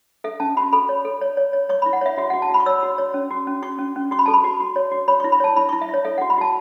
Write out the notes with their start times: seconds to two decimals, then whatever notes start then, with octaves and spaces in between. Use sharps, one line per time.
0.24 A4 E5
0.40 C#4 A5
0.57 F#4 B5
0.73 A4 B5
0.89 C#5
1.05 A4
1.21 C#5
1.37 C#5
1.53 C#5
1.69 C#5 C#6
1.82 B5
1.86 E4
1.93 F#5
2.01 C#5 E5
2.18 F#4 E5
2.30 F#4 F#5
2.42 A5
2.50 F#4 B5
2.60 C#6
2.66 C#5 E6
2.83 F#4
2.98 C#5
3.14 C#4
3.31 F#4
3.47 C#4
3.62 F#4 C#6
3.79 C#4
3.96 C#4
4.11 F#4 C#6
4.19 B5
4.26 A4 A5
4.34 B5
4.44 F#4
4.60 F#4
4.76 C#5
4.92 F#4
5.08 C#5 B5
5.20 C#6
5.24 E4
5.32 B5
5.40 C#5 A5
5.56 E4 B5
5.69 C#6
5.73 E4
5.81 E5
5.89 E4 C#5
6.05 A4 E5
6.18 F#5
6.21 F#4
6.30 B5
6.38 F#4 A5